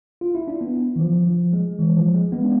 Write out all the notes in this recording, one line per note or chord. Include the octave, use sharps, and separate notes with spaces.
F4
E4
D4
B3
E3
F3
F3
G#3
E3
F3
G#3
B3
D4